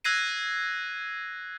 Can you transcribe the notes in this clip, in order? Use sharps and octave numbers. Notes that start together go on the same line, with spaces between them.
E6 F#6 G#6 A#6 C7 D#7